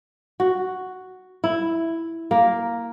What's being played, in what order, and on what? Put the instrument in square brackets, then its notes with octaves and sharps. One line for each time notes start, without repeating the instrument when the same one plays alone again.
[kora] F#4
E4
A#3